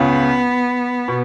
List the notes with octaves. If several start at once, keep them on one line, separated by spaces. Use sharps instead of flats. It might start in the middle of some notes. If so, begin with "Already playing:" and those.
Already playing: C#2 C#3 B3
B2